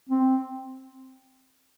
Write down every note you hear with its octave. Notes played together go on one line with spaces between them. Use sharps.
C4